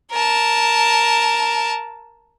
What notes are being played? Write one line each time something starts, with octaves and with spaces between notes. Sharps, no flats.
A#4 A5